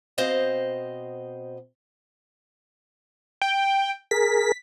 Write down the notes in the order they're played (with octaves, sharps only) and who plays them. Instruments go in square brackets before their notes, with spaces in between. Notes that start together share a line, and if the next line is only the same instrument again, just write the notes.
[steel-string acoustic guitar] B2 C4 C5 D#5 F5
[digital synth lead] G5
[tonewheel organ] G#4 A#4 [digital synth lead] B6